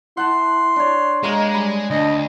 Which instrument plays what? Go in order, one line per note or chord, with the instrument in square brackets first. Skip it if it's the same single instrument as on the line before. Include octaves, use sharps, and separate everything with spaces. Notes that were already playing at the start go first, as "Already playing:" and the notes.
[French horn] E4 [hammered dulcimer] F#5 A5 [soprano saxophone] C6
[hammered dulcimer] D4 C#5
[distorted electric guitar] G#3 [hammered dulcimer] A#3 A#4 G#5 [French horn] D#5
[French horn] G3 [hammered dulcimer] B5
[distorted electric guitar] D2 [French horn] D4 [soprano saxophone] D#5